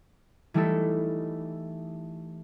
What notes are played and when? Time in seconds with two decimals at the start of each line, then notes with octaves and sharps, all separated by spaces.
0.54 E3 G3 A3 D#4 E4 A4